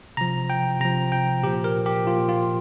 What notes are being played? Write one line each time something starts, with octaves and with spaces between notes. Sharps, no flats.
C3 F3 A#5
G5
C3 F3 A#5
G5
A#2 F3 G4
A#4
G4
A#2 F3 F4
F4